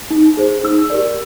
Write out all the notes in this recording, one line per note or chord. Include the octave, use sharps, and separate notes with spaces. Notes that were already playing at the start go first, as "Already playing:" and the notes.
D#4
G#4 C5
D#4 E6
G4 A#4 D5